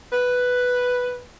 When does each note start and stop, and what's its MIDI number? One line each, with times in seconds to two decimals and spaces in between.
0.12 1.21 71